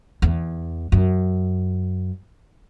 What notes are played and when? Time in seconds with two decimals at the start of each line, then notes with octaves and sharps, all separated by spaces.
0.22 E2
0.92 F#2